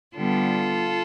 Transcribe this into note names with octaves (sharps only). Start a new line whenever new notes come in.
D3 G3 B3 F4 A4